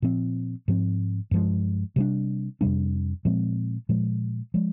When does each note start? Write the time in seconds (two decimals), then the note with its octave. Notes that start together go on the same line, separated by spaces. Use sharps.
0.02 A#2 F3 C4
0.68 G#2 F3 C4
1.31 G2 F3 G#3
1.96 C3 G3 D4
2.61 F2 C3 G3 D4
3.25 A#2 F3 G#3 C4
3.89 A#2 F3 G#3
4.54 F3 G#3